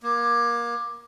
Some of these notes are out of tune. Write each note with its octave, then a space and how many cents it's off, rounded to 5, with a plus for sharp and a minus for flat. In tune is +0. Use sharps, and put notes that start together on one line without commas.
A#3 +25